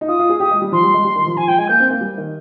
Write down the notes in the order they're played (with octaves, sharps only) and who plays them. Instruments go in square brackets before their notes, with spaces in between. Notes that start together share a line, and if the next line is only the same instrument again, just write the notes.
[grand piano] D#4
[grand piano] F4 [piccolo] D#6
[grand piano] F4
G#4
[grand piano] G4 [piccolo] D#6
[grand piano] G#3
G3
[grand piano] F3 [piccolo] C6
[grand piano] G3
G#3
G3
D#3
F3
[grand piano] F3 [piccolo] G#5
[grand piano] F3 [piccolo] G5
[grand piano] G#3 [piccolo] G#5
[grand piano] A#3 [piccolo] G6
[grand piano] C4
A#3
G3
D#3